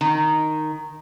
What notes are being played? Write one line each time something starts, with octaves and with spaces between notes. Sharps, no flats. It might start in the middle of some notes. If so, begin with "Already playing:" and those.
D#3